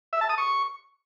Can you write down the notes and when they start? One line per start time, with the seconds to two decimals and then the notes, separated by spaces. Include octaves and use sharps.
0.13 E5
0.21 A5
0.29 D#6
0.38 C#6